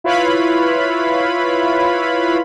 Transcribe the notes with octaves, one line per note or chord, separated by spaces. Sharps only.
E4 F4 B4 C#5 F5 B5